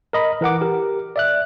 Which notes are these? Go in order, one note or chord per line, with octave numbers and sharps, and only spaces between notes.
A#4 D#5 B5
E3 A#4 F#5 D6
G4 A#4
D5 E5 F#6